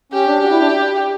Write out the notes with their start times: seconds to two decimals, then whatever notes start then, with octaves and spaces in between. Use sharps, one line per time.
0.12 C#4 G4
0.26 D4
0.40 F#4 G4
0.50 E4
0.59 D4